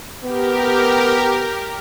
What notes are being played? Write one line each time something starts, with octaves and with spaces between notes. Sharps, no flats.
B3 G4 A#4